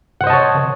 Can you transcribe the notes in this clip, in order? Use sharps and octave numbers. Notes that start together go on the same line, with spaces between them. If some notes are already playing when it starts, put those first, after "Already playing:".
C5 C#5 D#5 F#5 A5